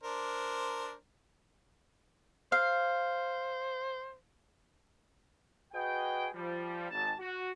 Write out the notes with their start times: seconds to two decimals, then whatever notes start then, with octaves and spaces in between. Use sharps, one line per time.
0.03 D4 A#4 C5
2.52 C5 F5
5.73 F#4 G#4 B4 D#5 G5
6.34 F3 G3
6.90 G#1 A5
7.19 F#4